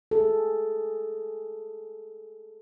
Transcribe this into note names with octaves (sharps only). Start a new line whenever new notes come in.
G#4 A4